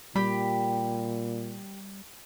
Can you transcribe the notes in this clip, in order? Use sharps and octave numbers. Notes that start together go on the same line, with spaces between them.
A#2 G3 G4 B5